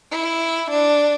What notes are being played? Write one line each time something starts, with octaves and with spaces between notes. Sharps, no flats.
E4
D4